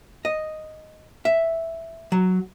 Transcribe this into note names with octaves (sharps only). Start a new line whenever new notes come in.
D#5
E5
F#3